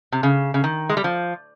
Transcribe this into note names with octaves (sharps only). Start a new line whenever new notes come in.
C3
C#3
C#3
D#3
G#3
G3
F3